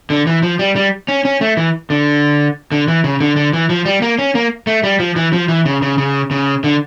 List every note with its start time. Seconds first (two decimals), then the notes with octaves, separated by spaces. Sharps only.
0.10 D3
0.27 E3
0.43 F3
0.59 G3
0.76 G3
1.08 C#4
1.25 C#4
1.41 A3
1.57 E3
1.90 D3
2.72 D3
2.88 E3
3.04 C#3
3.21 D3
3.36 D3
3.53 E3
3.70 F3
3.85 G3
4.02 A#3
4.19 C#4
4.35 A#3
4.67 A3
4.83 G3
4.99 F3
5.16 E3
5.33 F3
5.48 E3
5.65 C#3
5.82 C#3
5.98 C#3
6.31 C#3
6.64 D3